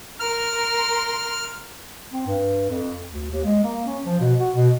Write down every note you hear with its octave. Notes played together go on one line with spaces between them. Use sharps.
A#4 C6 F6
C4
G2
F2
D2
D#2
G#3
A#3
C#4
F3
B2
F#4
B2